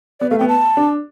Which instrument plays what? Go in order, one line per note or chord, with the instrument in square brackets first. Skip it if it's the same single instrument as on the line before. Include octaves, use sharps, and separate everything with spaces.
[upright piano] B3 [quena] D5
[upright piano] A3 [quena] F5
[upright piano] B3 [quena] G5
[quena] A5
[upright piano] D4